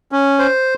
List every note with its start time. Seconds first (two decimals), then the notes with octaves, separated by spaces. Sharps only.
0.12 C#4
0.39 C5